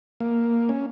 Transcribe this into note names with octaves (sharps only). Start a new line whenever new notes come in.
A#3
C#4